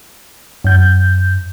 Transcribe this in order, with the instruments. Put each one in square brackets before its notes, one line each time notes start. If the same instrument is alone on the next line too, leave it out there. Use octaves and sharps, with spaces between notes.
[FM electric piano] F#2 G6